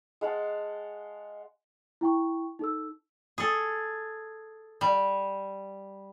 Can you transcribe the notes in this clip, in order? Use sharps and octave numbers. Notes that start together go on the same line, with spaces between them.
G#3 F5 F#5 A5
E4 G5 C#6
D#4 A4 E6
G#4 A4
G3